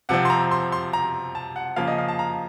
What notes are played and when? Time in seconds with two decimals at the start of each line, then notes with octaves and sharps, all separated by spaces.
0.09 C3 F3 C4 F#5
0.25 C6
0.30 A#5
0.51 C6
0.72 C6
0.93 A#5
1.35 A5
1.56 F#5
1.76 C#3 F3 A#3 F5
1.88 D#5
1.98 F5
2.08 A5
2.19 A#5